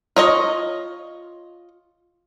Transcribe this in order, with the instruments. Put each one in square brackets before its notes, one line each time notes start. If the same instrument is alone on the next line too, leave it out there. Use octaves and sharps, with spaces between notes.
[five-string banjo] F4 C#5 D#5